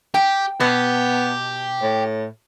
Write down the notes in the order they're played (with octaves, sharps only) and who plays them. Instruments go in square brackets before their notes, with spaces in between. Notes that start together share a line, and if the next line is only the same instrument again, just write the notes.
[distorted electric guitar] G4 [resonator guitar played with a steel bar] G5
[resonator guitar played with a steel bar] B2 [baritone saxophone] B3 [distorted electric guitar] G4
[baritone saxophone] A2